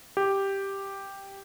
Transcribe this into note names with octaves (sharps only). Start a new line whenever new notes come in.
G4